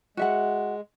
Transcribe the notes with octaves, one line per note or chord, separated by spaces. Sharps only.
G#3 F#4 E5 F#5